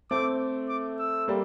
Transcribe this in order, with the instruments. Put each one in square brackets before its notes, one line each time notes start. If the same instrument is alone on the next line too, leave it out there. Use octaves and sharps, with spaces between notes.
[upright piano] A3 C4 [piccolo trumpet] D6
[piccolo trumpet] D6
E6
[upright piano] G3 A#3